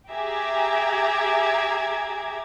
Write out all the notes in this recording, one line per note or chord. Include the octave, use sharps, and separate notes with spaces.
G4 G#4 E5 A#5 D6 G#6